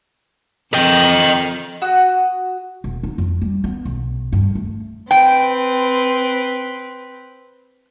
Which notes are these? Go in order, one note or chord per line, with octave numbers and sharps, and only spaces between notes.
F2 D#5 G5
F#4 D#6
E1
D#4
F2
G3
B3
B1
G2
A3
C4 B4 G5